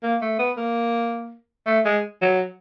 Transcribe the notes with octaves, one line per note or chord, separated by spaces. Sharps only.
A#3
A3
B3
A#3
A3
G#3
F#3